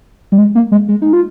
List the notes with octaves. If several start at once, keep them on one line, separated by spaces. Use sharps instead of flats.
G3
G#3
A#3
G#3
G#3
D#4
F4